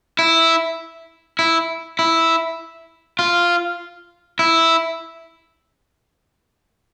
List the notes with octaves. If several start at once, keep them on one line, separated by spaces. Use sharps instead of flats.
E4
E4
E4
F4
E4